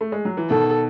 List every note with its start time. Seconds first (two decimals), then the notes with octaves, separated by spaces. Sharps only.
0.01 A3
0.12 G#3
0.25 F#3
0.37 E3
0.50 B2 D#3 A4